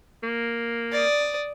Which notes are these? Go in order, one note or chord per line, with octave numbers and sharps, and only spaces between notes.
A#3
D5 D#6